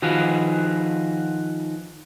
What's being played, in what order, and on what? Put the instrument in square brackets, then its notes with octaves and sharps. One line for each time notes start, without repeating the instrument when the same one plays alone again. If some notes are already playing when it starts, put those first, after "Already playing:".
[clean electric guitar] D#3 F3 F#4 G#4 B4 F5